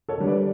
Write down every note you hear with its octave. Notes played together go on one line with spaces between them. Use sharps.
A4 C#5
D3 G3
B4 D5